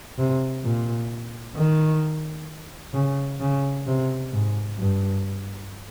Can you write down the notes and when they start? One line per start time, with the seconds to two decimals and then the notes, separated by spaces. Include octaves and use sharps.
0.18 C3
0.64 A#2
1.56 D#3
2.94 C#3
3.40 C#3
3.87 C3
4.33 G#2
4.79 G2